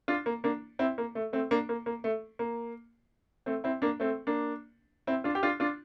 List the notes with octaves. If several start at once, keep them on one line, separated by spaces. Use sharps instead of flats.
D4 F4
A#3
A#3 D4
C4 E4
A#3
A3
A3 C4
A#3 D4
A#3
A#3
A3
A#3
A3 C4
C4 E4
A#3 D4
A3 C4
A#3 D4
C4 E4
D4 F4
G4
D4 F4
D4 F4